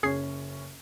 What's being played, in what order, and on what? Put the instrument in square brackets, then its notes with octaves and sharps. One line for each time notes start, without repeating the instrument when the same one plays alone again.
[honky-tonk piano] F#1 C#4 [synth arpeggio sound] G#4 G#6 C7